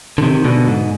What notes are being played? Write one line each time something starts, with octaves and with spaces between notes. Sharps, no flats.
D3
C3 D#3
B2 D3
G#2